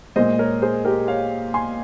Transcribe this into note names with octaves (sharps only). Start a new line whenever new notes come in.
A#2 G#3 C5 D#5
A#4 C#5
G#4 C5
G4 A#4
C#5 F5
G#5 C6